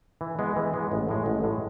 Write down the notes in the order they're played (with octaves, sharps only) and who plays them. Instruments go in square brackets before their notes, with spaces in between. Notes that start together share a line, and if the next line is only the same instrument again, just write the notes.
[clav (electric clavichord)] E3
G#3 B3
E3
G#3 B3
A1
A2 G#3
A1
A2 G#3